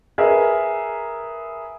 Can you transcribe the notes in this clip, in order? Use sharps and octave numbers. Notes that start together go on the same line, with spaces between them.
G#4 A#4 B4 E5